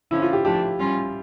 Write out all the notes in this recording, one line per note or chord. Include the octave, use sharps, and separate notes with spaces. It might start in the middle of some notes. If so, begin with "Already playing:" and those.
D3 F3 C#4 E4
F4
G4
F3 A3 D4 G4
G3 C#4 F4